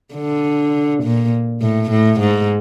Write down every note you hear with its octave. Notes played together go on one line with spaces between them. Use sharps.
D3
A#2
A2
A2
G#2